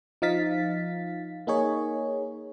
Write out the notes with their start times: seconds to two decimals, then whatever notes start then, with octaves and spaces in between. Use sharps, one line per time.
0.22 F3 D#4 F5 A6 B6
1.47 A#3 D#4 G#4 C#5